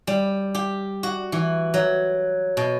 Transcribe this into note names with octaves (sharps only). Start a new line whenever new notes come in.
G3
G4
F#4
E3
F#3
B2